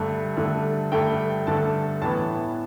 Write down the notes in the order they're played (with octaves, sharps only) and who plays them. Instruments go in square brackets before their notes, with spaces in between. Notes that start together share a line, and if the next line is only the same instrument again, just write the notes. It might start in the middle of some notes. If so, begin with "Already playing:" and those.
Already playing: [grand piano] G2 D3 A3
G2 D3 A3
G2 D3 A3 G5
G2 D3 A3 A5
A2 E3 B3 A5